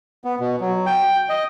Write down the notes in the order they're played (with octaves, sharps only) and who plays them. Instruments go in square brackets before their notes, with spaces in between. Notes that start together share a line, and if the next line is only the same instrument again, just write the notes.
[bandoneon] B3
B2
F#3
G5
D#5